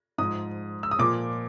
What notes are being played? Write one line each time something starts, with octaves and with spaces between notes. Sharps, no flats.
G#2 F3 D#6
E6
D#6
A#2 F3 D6